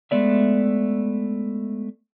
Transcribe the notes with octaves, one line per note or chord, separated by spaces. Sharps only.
G#3 A3 B3 D5 E5